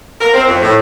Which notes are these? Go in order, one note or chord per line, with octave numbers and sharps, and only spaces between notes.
A#4
C4
F2
A2